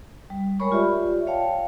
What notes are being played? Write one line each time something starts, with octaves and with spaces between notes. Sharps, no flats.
G3
G#3 A#4 C#5 B5 C#6
F4 G4 D5 E5
C#5 F5 G5 A5